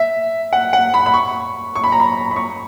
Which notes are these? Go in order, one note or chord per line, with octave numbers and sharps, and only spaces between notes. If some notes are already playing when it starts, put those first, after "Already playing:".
Already playing: E5
F#5
F#5
B5
B5
C#6
C#6
B5
A#5
B5
B5
C#6